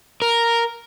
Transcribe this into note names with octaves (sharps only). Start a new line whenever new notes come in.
A#4